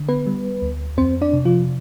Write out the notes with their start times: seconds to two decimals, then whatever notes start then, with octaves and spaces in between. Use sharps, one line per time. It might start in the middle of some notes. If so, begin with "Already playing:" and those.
Already playing: D3
0.09 B3 B4
0.26 G3
0.62 D2
0.97 F2 C4 C5
1.21 D4 D5
1.33 C3
1.45 F3 F4